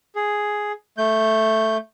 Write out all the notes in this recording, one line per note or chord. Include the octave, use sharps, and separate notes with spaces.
G#4
A3 G6